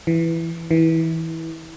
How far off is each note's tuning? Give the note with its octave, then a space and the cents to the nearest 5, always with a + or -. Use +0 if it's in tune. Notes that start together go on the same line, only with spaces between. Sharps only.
E3 +5
E3 -20